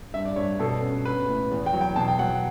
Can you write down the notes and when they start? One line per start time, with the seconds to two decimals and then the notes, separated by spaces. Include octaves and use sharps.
0.14 G2 E5
0.25 D5
0.36 G2 C#5
0.59 B2 A4
0.82 C#4
1.05 B3 B4
1.28 A2
1.51 E2
1.66 G5
1.73 F#3
1.81 G5
1.96 B2 A5
2.08 G5
2.19 F#3 F#5